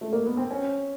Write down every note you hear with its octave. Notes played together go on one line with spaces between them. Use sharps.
A3
A#3
B3
C4
C#4